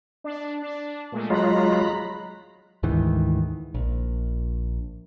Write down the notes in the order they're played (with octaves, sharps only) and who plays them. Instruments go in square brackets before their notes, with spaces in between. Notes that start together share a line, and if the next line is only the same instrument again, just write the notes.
[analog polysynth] D4
D4
A#2 G#3 A3
[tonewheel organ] F#3 G#3 F4 [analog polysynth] A#5 B5 F#6
[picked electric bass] D2 G#2 D#3 E3
A#1